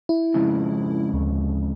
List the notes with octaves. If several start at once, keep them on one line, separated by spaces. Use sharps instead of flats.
E4
F2 G#2 C#3
D2